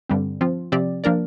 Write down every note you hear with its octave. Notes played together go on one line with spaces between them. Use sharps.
G2 D3 G3 C4
F3 C4 F4
C3 F3 C4 G4 D5
F3 A#3 D4 A#4 D5